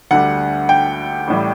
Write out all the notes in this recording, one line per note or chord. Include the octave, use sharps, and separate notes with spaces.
D2 D3 G3 F#5
G5
A1 A2 G3